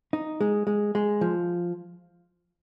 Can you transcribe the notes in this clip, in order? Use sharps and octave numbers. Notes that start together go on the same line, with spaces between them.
D#4
G#3
G#3
G#3
F3